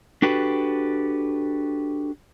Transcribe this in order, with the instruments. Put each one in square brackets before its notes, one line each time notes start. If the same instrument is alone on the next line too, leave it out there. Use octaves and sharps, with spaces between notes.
[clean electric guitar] D4 F#4 G4 A4 B4